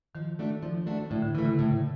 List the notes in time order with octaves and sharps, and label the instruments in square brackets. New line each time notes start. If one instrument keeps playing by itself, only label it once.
[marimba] D#3 [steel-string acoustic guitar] F3
[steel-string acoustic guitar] A3 D4 F#4
F3
A3 D4 F#4
[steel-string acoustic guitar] A2 [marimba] D3
[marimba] D3
[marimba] C#3 [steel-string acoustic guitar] E3
[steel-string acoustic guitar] A3
[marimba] C#3
[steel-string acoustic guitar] A2